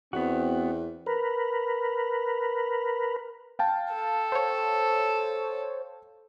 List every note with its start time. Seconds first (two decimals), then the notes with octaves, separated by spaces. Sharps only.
0.13 E2 B3 C4 F#4
1.06 A#4 B4
3.59 F5 G5 A5
3.94 A4
4.32 C5 C#5